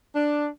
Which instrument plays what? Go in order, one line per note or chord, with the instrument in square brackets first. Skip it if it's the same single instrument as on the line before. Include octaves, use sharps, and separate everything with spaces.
[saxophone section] D4